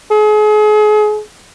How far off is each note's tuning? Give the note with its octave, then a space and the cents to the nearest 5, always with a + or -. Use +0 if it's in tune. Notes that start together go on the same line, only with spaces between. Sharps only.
G#4 +35